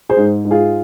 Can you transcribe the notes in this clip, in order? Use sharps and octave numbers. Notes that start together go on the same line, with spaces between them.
G#4 C5
G#2
G#2
F4 G#4